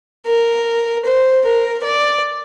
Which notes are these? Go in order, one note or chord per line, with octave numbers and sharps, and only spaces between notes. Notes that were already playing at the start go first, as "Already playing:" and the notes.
A#4
C5
A#4
D5